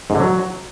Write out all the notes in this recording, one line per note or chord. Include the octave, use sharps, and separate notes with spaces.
G#2
D3
F#3